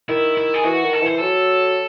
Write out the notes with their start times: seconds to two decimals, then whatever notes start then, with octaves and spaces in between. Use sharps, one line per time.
0.09 D#3 E4
0.37 E4
0.54 G#4
0.65 E3 F#4
0.84 D#3
0.93 A4
1.02 E3 C5
1.19 F#3 A4